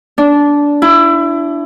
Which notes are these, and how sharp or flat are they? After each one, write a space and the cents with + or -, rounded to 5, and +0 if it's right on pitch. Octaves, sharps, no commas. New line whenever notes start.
D4 -15
E4 +25